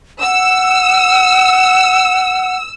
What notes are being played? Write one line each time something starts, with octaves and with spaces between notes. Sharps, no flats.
F#5 E6